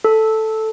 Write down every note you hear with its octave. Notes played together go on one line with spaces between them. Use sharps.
A4